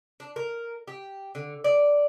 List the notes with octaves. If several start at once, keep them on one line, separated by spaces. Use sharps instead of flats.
D4
A#4
G4
D3
D5